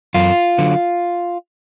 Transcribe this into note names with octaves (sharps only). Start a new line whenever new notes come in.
F#2 F4
D3 F#3